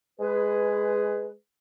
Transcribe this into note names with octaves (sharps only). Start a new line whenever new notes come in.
G#3 G#4 B4